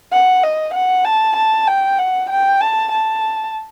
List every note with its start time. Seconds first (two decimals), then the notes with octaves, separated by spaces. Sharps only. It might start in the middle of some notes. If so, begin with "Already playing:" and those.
0.12 F#5
0.43 D#5
0.74 F#5
1.05 A5
1.36 A5
1.67 G5
1.98 F#5
2.30 G5
2.61 A5
2.92 A5